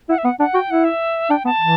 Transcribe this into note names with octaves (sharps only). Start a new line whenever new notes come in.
E4 F#5
E5
B3 F#5
D4 F#5
F#4 G5
E4 F#5
E5
D4 G5
B3 A5
E3